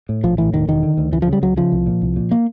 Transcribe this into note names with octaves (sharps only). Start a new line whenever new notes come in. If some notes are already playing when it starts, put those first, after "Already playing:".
A2
A#1 F3
A2 E3
E1 D#3
E1 D#3
D3
D2
C#2 E3
F3
C#3
G3
C#2 F#3
C#3 F3
C2
A#2
C2
A#2
A#3